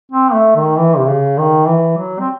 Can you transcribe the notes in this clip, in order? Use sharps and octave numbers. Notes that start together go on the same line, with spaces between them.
C4
A3
D#3
E3
C3
C#3
D#3
E3
F#3
C4